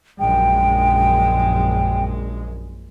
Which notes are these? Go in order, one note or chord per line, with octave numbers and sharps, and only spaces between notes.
A#1 F#2 G#3 G5